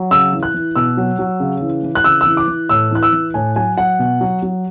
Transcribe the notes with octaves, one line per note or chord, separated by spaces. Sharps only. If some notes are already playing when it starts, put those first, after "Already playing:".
Already playing: F#3
C#3 E6
E3
F#6
E3
B2 E6
F#3
F#3
C#3
E3
E3
F#6
C#3 E6
E6
E3
D6
E3
A2 E6
E3 F#6
E6
E3
A2 G#5
F#3 G#5
F#3 F#5
B2
F#3
F#3